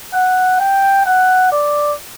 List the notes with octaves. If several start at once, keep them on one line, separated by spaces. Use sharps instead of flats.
F#5
G5
F#5
D5